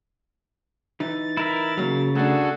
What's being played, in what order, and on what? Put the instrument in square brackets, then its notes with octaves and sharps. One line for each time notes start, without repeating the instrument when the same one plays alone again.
[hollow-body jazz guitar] E3 D#4 [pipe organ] A6
[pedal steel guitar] E4 A#4 E5
[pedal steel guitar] C#3 [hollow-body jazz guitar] F#3 A#3
[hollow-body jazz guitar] A3 D4 [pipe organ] F#4 G#4 A4